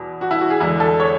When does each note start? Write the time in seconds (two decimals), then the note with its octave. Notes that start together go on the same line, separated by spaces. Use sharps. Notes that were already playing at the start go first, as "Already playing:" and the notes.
Already playing: E2 B2
0.21 F#4
0.31 E4
0.41 F#4
0.50 G#4
0.60 E2 D3 G#3 E4
0.80 A4
1.00 C#5